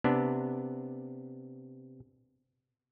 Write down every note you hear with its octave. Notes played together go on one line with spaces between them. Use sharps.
C3 B3 D4